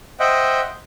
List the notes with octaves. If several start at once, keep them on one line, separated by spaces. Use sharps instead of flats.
C5 D#5 E5 F#5 G5